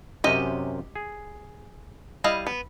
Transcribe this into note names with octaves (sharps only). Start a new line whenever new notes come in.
F#2 C3 C#4 G4 D#5
G#4
G3 E4 D#5 F5
B3